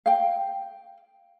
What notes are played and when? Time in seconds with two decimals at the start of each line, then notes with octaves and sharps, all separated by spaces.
0.06 F5 G5